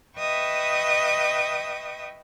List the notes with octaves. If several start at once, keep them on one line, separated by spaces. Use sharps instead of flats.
B4 D#5 E5 G5 C#6 D#6